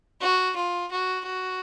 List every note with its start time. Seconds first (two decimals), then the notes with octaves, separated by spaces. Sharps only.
0.21 F#4
0.56 F4
0.91 F#4
1.26 F#4